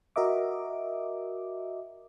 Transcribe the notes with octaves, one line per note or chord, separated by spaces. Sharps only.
F#4 A#4 D#5 E5 D6